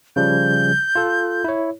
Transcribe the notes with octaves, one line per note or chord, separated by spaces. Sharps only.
C#3 F3 G3 G6
F4 A4
E4 C#5